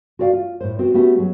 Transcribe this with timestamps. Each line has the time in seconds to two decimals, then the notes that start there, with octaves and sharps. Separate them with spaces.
0.19 F#4 A4 D5 E5 F5
0.33 F4
0.61 A2 C5
0.79 B3 C4 F#4
0.94 A3 B3 C#4 F#4 G4 B4
1.19 F#3 G#4